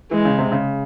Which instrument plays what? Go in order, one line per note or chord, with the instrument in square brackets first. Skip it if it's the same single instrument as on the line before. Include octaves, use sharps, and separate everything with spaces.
[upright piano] E3 [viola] G#3
[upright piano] C#3
C3
C#3